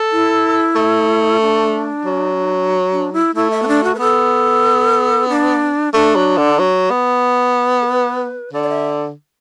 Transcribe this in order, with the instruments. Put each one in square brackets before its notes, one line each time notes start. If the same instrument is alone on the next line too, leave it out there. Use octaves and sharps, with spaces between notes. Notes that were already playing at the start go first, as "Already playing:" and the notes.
Already playing: [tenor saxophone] A4
[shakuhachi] E4
[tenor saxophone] A3
[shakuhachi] D4
[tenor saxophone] F#3
[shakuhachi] D4
E4
[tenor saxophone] A3 [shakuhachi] E4
[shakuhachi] E5
B3
D4
F#4
B4
[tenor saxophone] B3 [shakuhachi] A4
[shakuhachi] D4
[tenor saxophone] A3 [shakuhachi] D4
[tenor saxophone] F#3
D3
F#3
B3
[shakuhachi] A4
B4
[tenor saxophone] D3 [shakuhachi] D5
[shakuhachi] D5
E5